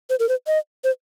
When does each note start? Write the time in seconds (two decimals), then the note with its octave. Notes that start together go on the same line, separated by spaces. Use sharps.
0.10 C5
0.20 A#4
0.29 C5
0.47 D#5
0.84 C5